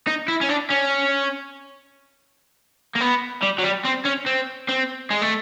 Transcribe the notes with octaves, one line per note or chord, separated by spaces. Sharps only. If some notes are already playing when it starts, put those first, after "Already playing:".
D#4
E4
C#4
D4
C#4
A#3
B3
G3
F#3
G3
C4
C#4
C4
C4
G#3
A3